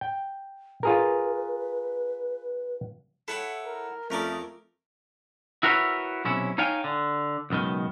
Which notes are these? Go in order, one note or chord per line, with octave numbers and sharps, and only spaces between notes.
G5
F4 G#4 A#4 B4
E4 A4 C#5 F#5 G5
A#4
F2 A3 C#4 A#4 D5 D#6
E4 F#4 A#4 B4 C#5
B1 C3 C#4 E4
D#4 C#5 F5 G5 G#5
D3
C#2 F#2 B2 D#3